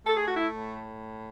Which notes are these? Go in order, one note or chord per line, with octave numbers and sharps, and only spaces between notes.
A3 A4
G#4
F#4
E4
A2